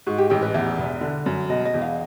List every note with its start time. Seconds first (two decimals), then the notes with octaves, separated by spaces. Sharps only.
0.07 G#2 F#4
0.18 G4
0.30 A1 G4
0.42 B4
0.54 E2 E5
0.78 E1
1.01 D3
1.26 F#2
1.49 B2 D#5
1.65 D#5
1.74 E2
1.82 F5